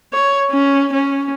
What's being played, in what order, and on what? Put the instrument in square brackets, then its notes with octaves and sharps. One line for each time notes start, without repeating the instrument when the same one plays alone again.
[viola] C#5
C#4
C#4